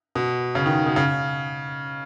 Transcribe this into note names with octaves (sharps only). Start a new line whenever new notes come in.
B2
C#3
D#3
B2
C#3